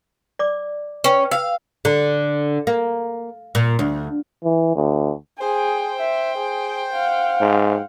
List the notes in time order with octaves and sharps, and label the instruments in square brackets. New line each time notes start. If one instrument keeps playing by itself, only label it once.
[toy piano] D5 D6
[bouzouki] C#4 [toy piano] B4 G5
[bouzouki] F5 [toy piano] E6
[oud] D3
A#3
A#2
D2
[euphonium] E3
D2
[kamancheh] G#4 [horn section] C5 G5
[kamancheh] E5
G#4
F5 F#5
[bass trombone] G#2